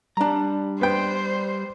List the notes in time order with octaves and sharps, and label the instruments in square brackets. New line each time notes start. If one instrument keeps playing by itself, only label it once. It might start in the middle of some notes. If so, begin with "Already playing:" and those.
[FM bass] G3 [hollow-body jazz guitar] D4 A#5
[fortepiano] B3 G5 [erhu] C5